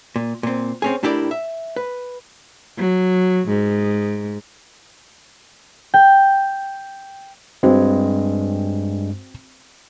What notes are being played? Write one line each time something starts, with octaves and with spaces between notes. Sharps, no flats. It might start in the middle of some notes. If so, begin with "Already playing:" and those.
A#2
A#2 C4
C4 C#4 G#4
A2 D4 E4 G4 A#4 D5
E5
B4
F#3
G#2
G5
G2 G#3 C4 F#4